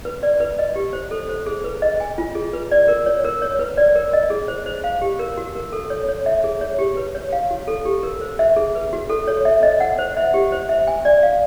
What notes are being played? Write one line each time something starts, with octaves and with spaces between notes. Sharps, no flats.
B4
D5
B4
D#5
G4
C5
A4
C5
G#4
B4
D#5
G#5
F4
G#4
B4
D5
A#4
C#5
A#4
C#5
B4
D5
A#4
D#5
G#4
C5
C5
F5
G4
A#4
F#4
A#4
A4
C#5
C#5
E5
G#4
C#5
G4
B4
C#5
F5
F#4
A4
G4
A#4
C5
E5
G#4
B4
F#4
A4
C#5
E5
D#5
F#5
C5
E5
G4
C5
E5
G#5
D5
F5